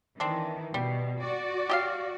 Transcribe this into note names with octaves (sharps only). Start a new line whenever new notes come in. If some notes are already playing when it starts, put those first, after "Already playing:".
D#3 E3 C4 D4
B2 G3
F#4 D5
G4 D#5 F5